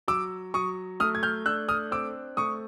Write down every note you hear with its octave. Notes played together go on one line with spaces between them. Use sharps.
F#3 D6 E6
F#3 C#6 D#6
A3 D#6 F6
G#6
F6 G6
D4 E6 F#6
D#6 F6
C4 D6 E6
A3 C#6 D#6